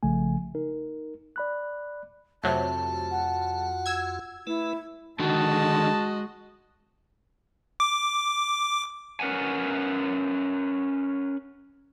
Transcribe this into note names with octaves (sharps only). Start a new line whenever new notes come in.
A#1 C#3 F3 A3 G#5
D#4 A#4
D5 B5 F#6
F2 C3 F#3 A3 F4 F#4 A5
F#5
E6 G#6
A3 E4 B4
D3 D#3 G#3 F#4 D#5 A5
D6
C#4 A#4 B4 F#5 G#5